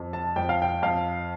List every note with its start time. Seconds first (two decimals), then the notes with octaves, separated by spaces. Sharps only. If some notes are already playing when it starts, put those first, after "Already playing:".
Already playing: F2
0.13 A5
0.36 F2 G5
0.49 F5
0.62 G5
0.82 F2 F5